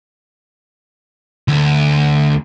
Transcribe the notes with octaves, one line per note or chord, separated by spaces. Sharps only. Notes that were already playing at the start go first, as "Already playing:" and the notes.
D2